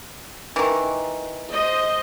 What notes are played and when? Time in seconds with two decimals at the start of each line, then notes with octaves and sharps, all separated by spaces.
0.56 D#3 E3
1.52 C5 D#5